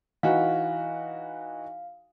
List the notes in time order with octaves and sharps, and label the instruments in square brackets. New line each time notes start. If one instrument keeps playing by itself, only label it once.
[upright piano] E3 D#4 F#4 [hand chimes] F5